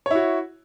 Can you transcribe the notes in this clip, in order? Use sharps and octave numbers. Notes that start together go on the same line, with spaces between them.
E4 F#4 C#5